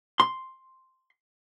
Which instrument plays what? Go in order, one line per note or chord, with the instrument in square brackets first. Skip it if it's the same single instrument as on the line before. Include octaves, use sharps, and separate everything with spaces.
[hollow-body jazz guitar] C6